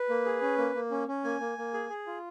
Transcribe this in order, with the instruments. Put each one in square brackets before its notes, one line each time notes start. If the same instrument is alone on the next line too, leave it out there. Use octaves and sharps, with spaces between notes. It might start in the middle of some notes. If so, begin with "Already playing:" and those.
Already playing: [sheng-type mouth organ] B4
A#3
G#4
C#4
A#3
A#3
C#4
C#4
A#3 G#5
A#3
A#3
G#4
G#4
F4